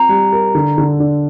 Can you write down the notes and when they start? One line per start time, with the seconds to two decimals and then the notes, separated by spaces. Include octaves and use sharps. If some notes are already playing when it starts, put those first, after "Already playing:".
Already playing: C4 F4 A#5
0.09 G3
0.32 A#4
0.55 D3
0.78 D3
1.00 D4